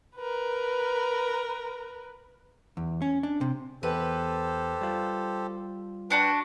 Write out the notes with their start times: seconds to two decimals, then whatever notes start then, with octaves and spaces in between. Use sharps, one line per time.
0.16 A#4 B4
2.77 E2
3.02 C#4
3.23 D4
3.41 C3
3.83 E2 G4 A4 B4 C5
4.81 G3 F4
6.10 D4 F#4 B4 G5 A5